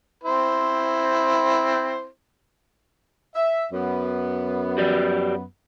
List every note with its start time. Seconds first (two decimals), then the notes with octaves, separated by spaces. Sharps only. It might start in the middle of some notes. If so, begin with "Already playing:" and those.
0.24 C4 E4 C5
3.35 E5
3.72 F#2 B3
4.78 F#4 G4 D5